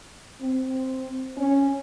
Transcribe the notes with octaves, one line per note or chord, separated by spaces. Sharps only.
C4
C#4